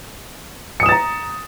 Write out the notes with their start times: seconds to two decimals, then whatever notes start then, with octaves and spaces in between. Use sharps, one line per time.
0.80 C#7
0.83 D#6
0.86 E7
0.89 A6
0.92 A#5